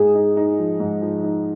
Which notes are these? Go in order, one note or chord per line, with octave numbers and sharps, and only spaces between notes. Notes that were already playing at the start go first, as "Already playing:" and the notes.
Already playing: G#2 G#4
D#4
D#4
F3
G#2
F3
D#4